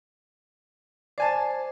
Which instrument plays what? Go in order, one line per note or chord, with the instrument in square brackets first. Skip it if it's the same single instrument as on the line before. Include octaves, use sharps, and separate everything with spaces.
[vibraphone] C5 [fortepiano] D5 G#5 A5